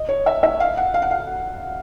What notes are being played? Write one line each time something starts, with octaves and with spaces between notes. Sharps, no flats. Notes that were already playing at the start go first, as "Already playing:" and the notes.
Already playing: D#5
C#5
E5
E5
F5
F#5
F5
F#5
F5